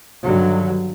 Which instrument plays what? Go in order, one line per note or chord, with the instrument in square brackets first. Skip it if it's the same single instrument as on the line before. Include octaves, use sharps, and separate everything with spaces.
[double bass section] G2 D3 D#3 F#3